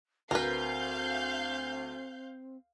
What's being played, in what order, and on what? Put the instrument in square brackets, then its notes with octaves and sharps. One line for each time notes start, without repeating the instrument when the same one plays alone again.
[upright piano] D2 [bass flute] C4 [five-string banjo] A#4 B4 [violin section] F5 G6